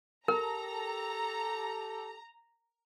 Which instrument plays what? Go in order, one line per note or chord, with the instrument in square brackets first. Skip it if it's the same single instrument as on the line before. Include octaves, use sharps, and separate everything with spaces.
[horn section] G4 A4 [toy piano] A#4 [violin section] A#5